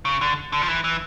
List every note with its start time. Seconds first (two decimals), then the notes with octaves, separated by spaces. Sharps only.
0.05 C#3
0.21 D3
0.52 D3
0.62 F3
0.68 E3
0.84 E3